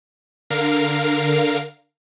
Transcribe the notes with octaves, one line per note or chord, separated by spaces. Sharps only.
D3 A#4 F5